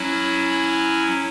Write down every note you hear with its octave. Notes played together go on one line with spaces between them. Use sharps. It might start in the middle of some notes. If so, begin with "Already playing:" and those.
Already playing: F#3 C#4 E4